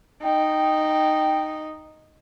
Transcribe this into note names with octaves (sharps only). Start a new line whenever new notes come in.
D#4 G5